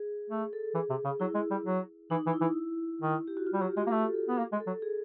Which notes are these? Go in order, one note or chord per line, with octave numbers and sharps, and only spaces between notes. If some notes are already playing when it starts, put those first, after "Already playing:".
Already playing: G#4
A3
A4
E3 G#4
C3
C#3
F#3 E4
G#3
G3
F#3
E3 D#4
E3
E4
E3
D#3
G4
F#4
F4
G3
F#3 G4
G#3 G4
A#3
A3 A4
A4
B3
A#3
G#3
A4
F#3
G#4